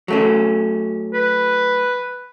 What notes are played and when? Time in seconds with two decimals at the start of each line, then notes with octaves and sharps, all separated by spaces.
0.08 F#3 A3 C#4
1.14 B4